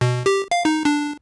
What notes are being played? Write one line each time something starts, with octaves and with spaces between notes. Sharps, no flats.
B2
G4
F5
D#4
D4